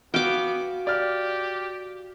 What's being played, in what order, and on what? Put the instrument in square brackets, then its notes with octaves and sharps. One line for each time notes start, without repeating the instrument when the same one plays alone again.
[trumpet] B3 [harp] F#4 F5 [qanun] G5 D6
[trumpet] G4 [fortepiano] D5 F6